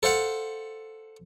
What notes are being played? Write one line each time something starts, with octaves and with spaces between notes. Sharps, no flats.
A4 C5 F5 F#5